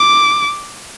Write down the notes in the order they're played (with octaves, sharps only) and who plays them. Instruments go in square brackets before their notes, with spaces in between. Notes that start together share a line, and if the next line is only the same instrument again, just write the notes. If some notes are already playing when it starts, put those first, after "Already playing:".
Already playing: [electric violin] D6